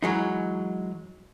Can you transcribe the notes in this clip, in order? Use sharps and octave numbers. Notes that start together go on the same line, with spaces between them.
E3 F#3 G#3 D#4